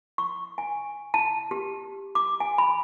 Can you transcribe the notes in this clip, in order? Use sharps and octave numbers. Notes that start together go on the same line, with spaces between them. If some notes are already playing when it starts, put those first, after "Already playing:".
C#6
G#5
A5
G4
D6
G#5
B5